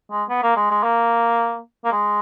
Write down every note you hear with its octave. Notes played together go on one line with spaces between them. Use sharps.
G#3
B3
A#3
G#3
G#3
A#3
A#3
G#3